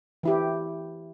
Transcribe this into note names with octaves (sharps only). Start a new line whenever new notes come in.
E3 E4 G4